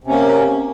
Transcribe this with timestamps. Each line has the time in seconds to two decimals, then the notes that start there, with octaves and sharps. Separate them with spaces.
0.04 C3
0.07 C#4
0.10 A#3